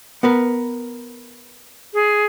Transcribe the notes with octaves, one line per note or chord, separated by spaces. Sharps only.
B3 A#4 B4
G#4